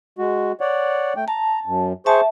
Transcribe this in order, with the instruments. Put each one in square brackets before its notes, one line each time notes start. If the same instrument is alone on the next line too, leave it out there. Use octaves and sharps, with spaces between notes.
[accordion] G#3 F#4
C#5 D5 F#5
A3 G5
[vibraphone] A5 [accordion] A#5
[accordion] F#2
[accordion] G#4 C5 C#6 [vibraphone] E5 A5